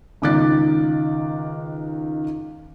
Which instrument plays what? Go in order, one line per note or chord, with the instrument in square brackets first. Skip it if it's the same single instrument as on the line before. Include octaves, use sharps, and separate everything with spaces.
[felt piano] C#2 D#3 D6 F#6 A6